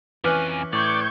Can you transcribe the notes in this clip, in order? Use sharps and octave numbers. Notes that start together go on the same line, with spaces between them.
F2 E3 C#4 G#5 D6 F6 F#6
A2 D5 C#6 G6 G#6